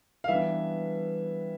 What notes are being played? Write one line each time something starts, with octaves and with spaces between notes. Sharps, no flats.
F5
E3 G3 B3 D4 E5